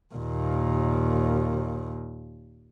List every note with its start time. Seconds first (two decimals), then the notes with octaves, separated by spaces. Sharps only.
0.15 D#2 A#2